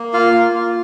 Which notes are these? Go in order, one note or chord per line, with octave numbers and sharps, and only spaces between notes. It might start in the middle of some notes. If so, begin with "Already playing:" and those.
Already playing: A#3
F4 F5
A#3
F4